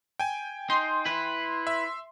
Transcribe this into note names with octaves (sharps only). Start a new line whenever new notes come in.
G5 G#5
D#4 C6
E4 B4
E5